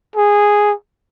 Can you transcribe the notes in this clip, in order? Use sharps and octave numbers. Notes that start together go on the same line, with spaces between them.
G#4